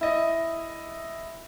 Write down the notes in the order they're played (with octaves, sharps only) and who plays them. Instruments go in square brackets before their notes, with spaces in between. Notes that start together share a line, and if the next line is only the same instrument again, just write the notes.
[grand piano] E4 D#5